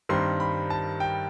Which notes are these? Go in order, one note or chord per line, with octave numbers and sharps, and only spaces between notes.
G2 D#3 G3 C4 C6
B5
A5
G5